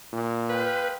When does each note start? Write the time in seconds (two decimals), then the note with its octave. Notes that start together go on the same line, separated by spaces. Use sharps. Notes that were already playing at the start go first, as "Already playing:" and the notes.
0.13 A#2
0.49 G#3 B4 F5 G5